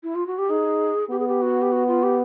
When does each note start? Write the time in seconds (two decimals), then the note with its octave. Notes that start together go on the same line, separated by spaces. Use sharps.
0.03 E4
0.15 F4
0.27 F#4
0.38 G4
0.50 D#4 G#4
1.11 B3 G4
1.19 G#4
1.28 G4
1.42 F#4
1.62 G4
1.72 F#4
1.88 F4
2.03 G4